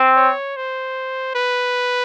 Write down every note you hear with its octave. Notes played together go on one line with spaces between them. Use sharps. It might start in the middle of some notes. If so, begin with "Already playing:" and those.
Already playing: C4
C#5
C5
B4